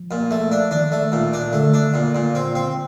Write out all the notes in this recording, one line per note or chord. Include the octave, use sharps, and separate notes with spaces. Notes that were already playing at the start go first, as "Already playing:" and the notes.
Already playing: F3
A#2
A3
D4
D#3 D4
A3
A#2 D#3
D4
D3 A3
D4
A#2
A#2
C4
C4